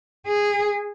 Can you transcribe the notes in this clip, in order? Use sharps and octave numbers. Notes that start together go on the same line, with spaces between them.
G#4